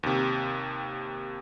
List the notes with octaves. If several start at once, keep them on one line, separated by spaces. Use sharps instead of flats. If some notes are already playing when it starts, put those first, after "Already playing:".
D#2 C3